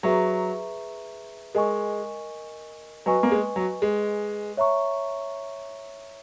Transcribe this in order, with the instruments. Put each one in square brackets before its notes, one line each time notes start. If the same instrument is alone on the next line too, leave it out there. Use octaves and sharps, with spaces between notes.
[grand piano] F#3 [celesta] G#4 B4 E5 A#5 C#6
[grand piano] G#3 [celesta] A#4 D#5 G#5 C#6
[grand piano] F#3 [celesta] B4 D#5 G#5 C#6
[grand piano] A#3
G#3
F#3
G#3
[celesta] C#5 E5 A#5 C#6